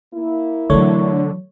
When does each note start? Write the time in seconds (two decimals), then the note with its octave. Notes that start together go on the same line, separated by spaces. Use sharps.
0.13 A#3 E4
0.70 D3 E3 F#3 A3 C#5